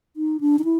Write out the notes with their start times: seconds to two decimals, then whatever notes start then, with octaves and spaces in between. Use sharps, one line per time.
0.17 D#4
0.40 D4
0.59 D#4
0.64 E4